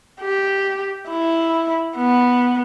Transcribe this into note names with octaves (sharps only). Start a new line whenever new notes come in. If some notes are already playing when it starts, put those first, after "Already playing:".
G4
E4
B3